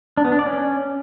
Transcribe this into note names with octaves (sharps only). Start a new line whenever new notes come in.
D4
B3
D4
D5
C#4